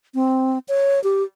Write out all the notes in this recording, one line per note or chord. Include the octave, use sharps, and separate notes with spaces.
C4
C#5
G4